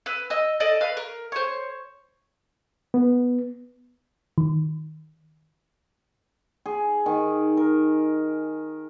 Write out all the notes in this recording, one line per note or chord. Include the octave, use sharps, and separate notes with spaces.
B4 E6
D#5 E6
A4 D5 D#5
B4 F5 F6
A#4
C5 C#5
B3
D#3
G#4
D#3
A#4